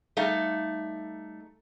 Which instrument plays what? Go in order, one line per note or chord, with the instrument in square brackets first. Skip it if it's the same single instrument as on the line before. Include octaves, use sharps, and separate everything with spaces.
[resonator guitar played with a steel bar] G3 A3 D#4 F5